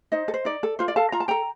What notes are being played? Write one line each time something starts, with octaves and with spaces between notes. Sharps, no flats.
D#4 C5 D#5
A4
C5
D#4 D5
A4
F4 C5
D5
A4 F5 A5
F4 A#5
A5
A4 G5 A#5